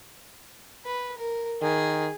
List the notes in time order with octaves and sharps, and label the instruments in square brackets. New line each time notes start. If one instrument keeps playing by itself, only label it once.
[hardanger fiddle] B4
A#4
[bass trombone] D#3 [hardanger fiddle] G#4